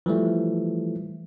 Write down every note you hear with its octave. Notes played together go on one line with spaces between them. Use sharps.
E3 F3 G3 A3